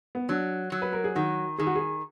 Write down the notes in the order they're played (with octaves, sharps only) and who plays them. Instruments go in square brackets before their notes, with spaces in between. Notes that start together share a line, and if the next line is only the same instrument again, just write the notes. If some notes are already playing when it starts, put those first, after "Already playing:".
[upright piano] B3
[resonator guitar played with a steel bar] F#3 [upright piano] D4
[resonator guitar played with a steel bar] F#3
[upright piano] B4
A#4
G#4
[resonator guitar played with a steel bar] D#3 [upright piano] F#4
[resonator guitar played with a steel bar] D#3 [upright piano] G#4
[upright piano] F#4
G#4